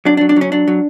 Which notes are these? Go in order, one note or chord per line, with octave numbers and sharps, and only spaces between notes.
F#3 D4
D4
F#3
D4
F#3 C#4
F#3 D4
F#3